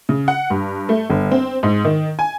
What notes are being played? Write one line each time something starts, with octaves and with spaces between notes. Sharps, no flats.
C#3
F#5
G2
A3
G1
C4
G#2
D#3
G#5